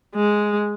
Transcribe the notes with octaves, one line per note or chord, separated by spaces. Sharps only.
G#3